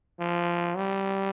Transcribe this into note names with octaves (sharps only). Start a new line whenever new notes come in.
F3
G3